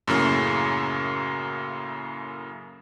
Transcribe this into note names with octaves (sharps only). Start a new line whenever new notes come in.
F#2 A2 C#3 A#3